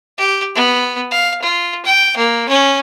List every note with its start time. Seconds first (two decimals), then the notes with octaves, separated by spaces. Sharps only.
0.17 G4
0.55 B3
1.11 F5
1.42 F4
1.85 G5
2.16 A#3
2.49 C#4